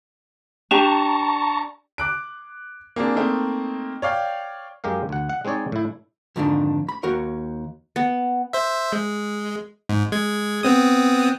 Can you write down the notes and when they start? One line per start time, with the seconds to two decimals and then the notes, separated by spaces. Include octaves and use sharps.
0.71 D4 G4 A5 A#5 C#6
1.98 D6 F#6 D7
2.96 A#3 C4 D4 G#4
3.16 A3 A#3 C4 D#4
4.02 C#5 D5 F5 G5
4.84 F#2 G#3 G4 A#4 F5
5.09 D2 F#5
5.29 F#5
5.45 G#3 C4 D#4 C#5 D5
5.72 A2 E4
6.36 F2 G#2 D3 D#3 D4
6.89 B5
7.03 D#2 F#4 A#4 C#5
7.96 B3
8.53 C5 E5
8.92 G#3
9.89 G#2
10.12 G#3 G#6
10.63 B3 C4 D#6